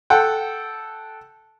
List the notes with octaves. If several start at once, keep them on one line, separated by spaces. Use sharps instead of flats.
A4 F#5 G5